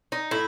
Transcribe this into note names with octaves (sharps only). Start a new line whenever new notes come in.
D#4
A2 E4